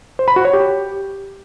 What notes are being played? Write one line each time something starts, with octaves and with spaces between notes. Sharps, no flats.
C5
B5
F#4
C#5
G4